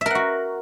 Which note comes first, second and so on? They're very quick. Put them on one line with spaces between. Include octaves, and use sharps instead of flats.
E5 A#4 F#5 F#4